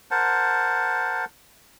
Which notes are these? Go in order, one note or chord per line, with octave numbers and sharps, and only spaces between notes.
A#4 C5 F#5 A5